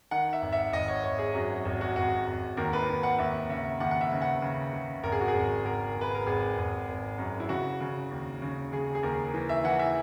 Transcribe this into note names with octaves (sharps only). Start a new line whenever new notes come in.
D#3 F#5
E5
G#1
E5
G#1 D#5
C#5
G#1 C#5
G#4
F#2 F#4
G#1 F#4
F#4
G#1 F#4
G#1
D#2 A#4
B4
D#2
F#5
D#2 E5
C#3 E5
D#2 F#5
F#5
E5
C#3
F#5
C#3
C#3
G#1 A#4
G#4
F#4
G#4
G#1
G#1 A#4
G#1
B4
A#4
G#1 G#4
G#1
G#1
F#2
E4
C#3 F#4
C#3
D#2
C#3
C#3 G#4
G#4
D#2 A#4
E3
E5
E3 F#5
E5